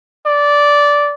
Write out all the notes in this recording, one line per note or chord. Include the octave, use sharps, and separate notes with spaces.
D5